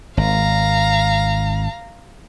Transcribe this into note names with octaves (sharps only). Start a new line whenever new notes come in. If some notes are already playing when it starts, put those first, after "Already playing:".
G#1 F5 A#5